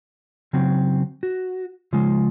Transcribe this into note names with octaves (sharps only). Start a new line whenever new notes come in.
C#3 F#3 C4
F#4
C#3 F3 G#3